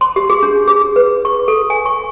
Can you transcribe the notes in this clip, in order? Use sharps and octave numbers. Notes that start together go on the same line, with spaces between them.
C6
G4
G#4
D4
G#4
B4
C#6
A4
G#5
C#6